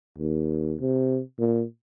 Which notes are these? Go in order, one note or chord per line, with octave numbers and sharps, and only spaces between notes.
D#2
C3
A#2